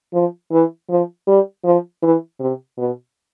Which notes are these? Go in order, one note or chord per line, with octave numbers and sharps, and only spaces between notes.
F3
E3
F3
G3
F3
E3
C3
B2